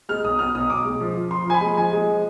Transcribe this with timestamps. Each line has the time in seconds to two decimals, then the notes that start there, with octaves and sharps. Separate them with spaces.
0.09 G#3 F6
0.24 B1 D#6
0.39 B2 F6
0.55 B1 D#6
0.70 B1 D6
0.85 G#3
1.00 F3
1.16 F3
1.31 F3 C6
1.46 F3 G#5
1.54 B5
1.61 G#3
1.77 F3 G#5
1.92 G#3
2.08 F3